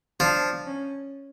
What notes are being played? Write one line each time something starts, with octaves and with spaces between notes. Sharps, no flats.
F3 D4
C#4